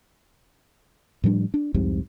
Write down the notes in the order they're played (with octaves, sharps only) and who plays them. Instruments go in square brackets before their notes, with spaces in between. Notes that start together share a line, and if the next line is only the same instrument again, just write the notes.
[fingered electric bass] A2 F3 G3 D4
D4
C2 F2 G#2 C3